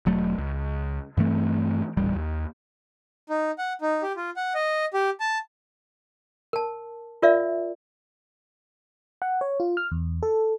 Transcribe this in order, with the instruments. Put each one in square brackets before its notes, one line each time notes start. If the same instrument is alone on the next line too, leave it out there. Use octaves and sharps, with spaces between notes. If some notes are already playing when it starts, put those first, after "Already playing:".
[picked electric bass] E1 F#3 A3
C#2
G2 E3 A3 C4
D#1 A1 G3
D#2
[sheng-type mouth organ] D#4
F#5
D#4
G4
F4
F#5
D#5
G4
A5
[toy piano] A#4 A5
F4 A#4 D5 E5 F5
[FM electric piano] F#5
C#5
F4
F6
E2
A4